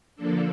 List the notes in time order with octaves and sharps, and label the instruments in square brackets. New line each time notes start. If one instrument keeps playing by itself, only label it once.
[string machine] D3 F3 A#3 D4 A4